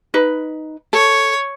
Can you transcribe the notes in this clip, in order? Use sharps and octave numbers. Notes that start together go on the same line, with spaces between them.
D#4 B4
A4 C#5